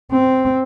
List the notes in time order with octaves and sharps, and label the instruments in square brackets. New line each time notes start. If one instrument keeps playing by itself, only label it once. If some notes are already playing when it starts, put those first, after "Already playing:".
[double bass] C4